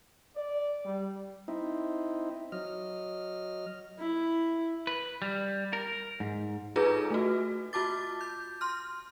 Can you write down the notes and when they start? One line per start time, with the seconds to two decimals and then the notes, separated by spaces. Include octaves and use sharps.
0.37 D5
0.86 G3
1.48 C4 D#4 E4
2.52 F#3 D#5 F6
3.98 E4
4.87 B4
5.22 G3
5.73 A#4
6.20 G#2
6.76 D#4 F4 G#4 A4 B4 A#5
7.11 A3 F#4
7.73 F4 F#4 A5 D6 A6
8.21 G6
8.61 C6 F6